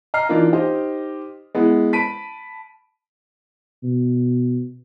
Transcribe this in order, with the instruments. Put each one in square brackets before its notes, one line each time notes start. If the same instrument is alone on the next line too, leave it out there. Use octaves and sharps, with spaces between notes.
[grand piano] D#5 A#5 F6 C7
E3 A#3 D4 D#4 F4
D#4 G4 C5 D#5
G#3 B3 E4
A5 B5 B6 D7 D#7
[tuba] B2